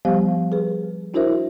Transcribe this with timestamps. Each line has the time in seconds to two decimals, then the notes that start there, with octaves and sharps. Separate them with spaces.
0.05 F3 G3 B3 G4 C5 F5
0.52 G#4 B4
1.14 D4 E4 F#4 A#4 C5 E5